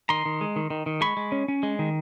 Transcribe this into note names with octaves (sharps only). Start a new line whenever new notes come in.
D#3 A#5 C6
D#3
G#3
D#3
D#3
D#3
G#3 B5 C#6
G#3
C#4
C#4
G#3
D#3